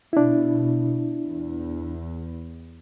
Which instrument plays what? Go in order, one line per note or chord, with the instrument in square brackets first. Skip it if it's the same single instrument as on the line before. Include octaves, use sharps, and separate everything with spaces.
[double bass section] B2 [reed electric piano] D4 E4
[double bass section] E2